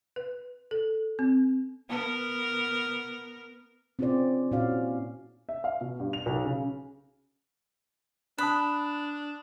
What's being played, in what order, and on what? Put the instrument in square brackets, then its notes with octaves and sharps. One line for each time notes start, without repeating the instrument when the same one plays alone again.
[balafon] B4
A4
C4
[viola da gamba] B3 A#4
[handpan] C4 C#4 F4 G#4 C5 D5
A#2 C#4 E4 F#4 D5 F5
[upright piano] E5
F5
B2
G2
F7
B1
C#3
[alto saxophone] D4 [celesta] A5 D#6 F#6 [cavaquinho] B5